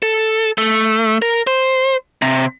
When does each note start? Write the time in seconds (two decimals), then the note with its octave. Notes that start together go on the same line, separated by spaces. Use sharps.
0.02 A4
0.58 A3
1.22 A#4
1.47 C5
2.22 C3